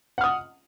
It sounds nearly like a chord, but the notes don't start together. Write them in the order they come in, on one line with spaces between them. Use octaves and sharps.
F#5 F6 D#6